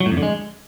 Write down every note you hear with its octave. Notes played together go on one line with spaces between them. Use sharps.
F#3
A2
F2
D3
G#3